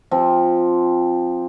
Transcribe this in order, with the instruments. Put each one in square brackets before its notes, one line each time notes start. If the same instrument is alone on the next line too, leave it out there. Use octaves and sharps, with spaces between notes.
[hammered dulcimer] F3 C4